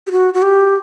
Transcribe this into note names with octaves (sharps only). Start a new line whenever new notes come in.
G4
F#4
F#4
G4